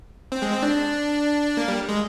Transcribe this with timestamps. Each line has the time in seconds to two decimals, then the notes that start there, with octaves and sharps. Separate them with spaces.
0.32 C4
0.42 G#3
0.52 C4
0.63 D4
1.57 A#3
1.68 G3
1.89 G#3